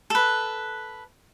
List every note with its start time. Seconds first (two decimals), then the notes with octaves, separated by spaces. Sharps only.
0.10 A4 B4